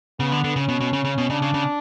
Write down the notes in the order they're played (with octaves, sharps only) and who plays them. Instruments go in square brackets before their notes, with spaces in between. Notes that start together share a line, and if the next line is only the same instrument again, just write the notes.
[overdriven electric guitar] C#3 [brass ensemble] B3
[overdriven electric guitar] D3
D3
[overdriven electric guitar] C#3 [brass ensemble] C#4
[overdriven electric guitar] B2
B2
C#3
C#3
B2
[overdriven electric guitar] C#3 [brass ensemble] D4
[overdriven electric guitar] C#3
C#3